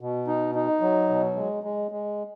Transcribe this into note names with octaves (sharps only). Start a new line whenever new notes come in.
B2
D#4
D#4
F#3
B2
G#3
G#3
G#3